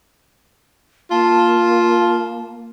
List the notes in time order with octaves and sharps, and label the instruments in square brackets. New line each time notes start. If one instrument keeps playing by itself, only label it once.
[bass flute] A#3 [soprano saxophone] F4 [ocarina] A5